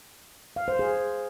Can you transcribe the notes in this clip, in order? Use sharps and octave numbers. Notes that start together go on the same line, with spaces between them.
F5
C5
G#4